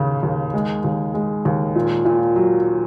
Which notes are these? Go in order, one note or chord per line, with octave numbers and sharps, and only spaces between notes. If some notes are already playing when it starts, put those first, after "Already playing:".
Already playing: D#2 C#3
D#2
G#3
D#2
G#3
D#2
A#2
A#2
F#3